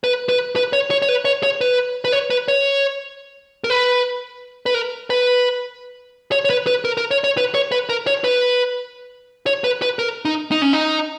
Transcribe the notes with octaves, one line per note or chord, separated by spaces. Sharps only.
B4
B4
B4
C#5
C#5
C#5
B4
C#5
C#5
B4
B4
C#5
B4
C#5
A#4
B4
B4
A#4
B4
C#5
C#5
B4
B4
A#4
A#4
C#5
C#5
B4
C#5
B4
A#4
C#5
B4
C#5
B4
B4
A#4
D#4
D#4
C#4
D#4